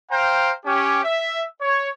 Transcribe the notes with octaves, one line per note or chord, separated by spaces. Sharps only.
C5 F5 G5 A#5
C#4 G4
E5
C#5